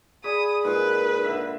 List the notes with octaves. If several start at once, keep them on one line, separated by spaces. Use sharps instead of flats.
G#4 D5 G#5 B5 D#6
A#2 G#3 D#4 B4
D3 E5